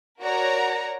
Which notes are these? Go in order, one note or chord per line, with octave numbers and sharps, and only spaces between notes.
F#4 A#4 C#5 D5 A#5